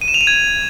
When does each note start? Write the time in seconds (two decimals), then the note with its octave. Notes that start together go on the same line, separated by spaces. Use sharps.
0.01 D#7
0.08 E7
0.14 F7
0.21 D#7
0.27 G#6